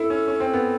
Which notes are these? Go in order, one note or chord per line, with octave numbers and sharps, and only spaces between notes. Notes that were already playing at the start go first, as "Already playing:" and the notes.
Already playing: E4 A4
C#4
C#4
C4
B3